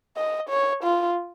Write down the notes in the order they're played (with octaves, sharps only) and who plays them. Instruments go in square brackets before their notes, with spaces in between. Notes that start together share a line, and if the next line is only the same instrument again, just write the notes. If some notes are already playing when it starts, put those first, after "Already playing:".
[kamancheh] D#5
C#5
F4